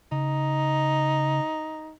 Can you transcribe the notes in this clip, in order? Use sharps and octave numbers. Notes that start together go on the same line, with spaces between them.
C#3 D#4